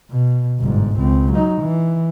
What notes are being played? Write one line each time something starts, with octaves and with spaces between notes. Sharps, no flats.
B2
G1 G#2
C#2 C4
F#3 D#4
E3